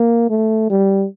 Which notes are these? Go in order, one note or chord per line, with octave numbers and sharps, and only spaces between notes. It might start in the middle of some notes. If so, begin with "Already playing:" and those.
Already playing: A#3
A3
G3